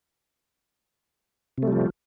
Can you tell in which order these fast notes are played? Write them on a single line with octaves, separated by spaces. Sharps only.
C3 A3 G3 F3